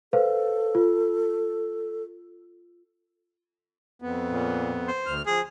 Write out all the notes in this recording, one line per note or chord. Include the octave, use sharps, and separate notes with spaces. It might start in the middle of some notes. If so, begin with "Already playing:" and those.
A4 B4 C5 F5
F4
F2 B3
A#2
C5
D2 F6
F3 G#4